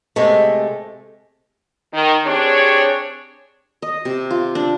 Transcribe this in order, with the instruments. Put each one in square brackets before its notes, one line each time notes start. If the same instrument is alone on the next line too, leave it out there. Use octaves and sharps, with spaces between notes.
[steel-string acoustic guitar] C3 G#3 A3
[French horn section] D#3
C4 D4 G4 G#4 C#5
[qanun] D#5
C3
F4
D4